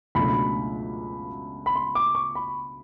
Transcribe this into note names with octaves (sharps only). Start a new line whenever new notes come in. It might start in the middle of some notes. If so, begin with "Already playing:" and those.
C#2 B2 F#3 A3 D4 B5
B5
C6
D6
C#6
B5